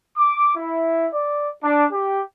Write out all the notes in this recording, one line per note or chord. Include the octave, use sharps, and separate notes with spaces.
D6
E4
D5
D4
G4